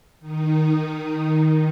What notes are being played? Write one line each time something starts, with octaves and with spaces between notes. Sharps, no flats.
D#3 D#4